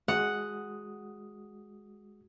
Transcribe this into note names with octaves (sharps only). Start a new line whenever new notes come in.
G#3 F#4 F#5 D#6